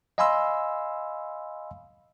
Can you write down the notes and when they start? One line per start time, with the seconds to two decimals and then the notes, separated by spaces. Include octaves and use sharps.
0.18 D#5 F5 G#5 B5 C6 E6